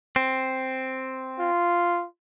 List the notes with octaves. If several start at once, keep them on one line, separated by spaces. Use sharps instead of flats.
C4
F4